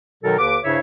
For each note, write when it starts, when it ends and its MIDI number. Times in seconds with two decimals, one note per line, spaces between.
0.23 0.36 47
0.23 0.36 51
0.23 0.36 54
0.23 0.36 63
0.23 0.36 69
0.23 0.36 70
0.39 0.57 39
0.39 0.57 50
0.39 0.57 71
0.39 0.57 86
0.64 0.79 43
0.64 0.79 49
0.64 0.79 64
0.64 0.79 72
0.64 0.79 73
0.64 0.79 76